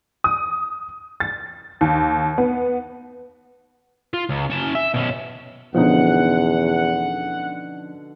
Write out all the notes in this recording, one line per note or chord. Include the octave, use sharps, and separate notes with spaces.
D#6
A6
D#2
B3
F4
C#2
C#4 A5
E5
B2 C#4
E2 B2 D3 F3 C#4 D#4 F#5